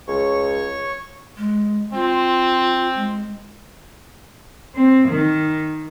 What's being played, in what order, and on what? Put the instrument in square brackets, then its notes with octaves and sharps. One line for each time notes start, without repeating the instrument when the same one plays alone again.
[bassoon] C#2 [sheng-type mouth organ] C#5 C#6
[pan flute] G#3
[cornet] C4 [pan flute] F4
[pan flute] G#3
[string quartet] C4
D#3